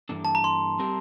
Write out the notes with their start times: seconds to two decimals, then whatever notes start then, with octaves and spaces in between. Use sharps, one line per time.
0.09 G2 E3 A#3 D4 A4
0.25 A5
0.35 A#5
0.44 C6
0.79 G3 C4 G4 A#4